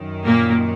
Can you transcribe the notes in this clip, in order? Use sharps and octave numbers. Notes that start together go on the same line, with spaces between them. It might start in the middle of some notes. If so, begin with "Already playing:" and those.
Already playing: F#2 D#3
A#2 A#3